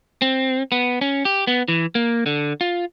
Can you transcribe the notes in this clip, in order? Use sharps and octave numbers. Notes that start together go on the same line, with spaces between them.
C4
B3
C#4
G4
B3
E3
A#3
D3
F4